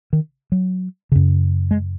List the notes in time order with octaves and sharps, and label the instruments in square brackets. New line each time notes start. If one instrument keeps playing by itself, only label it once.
[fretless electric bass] D#3
F#3
F#2 C#3
G#3